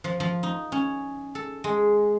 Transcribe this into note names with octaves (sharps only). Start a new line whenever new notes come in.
F3
F3
D#4
C#4
A4
G#3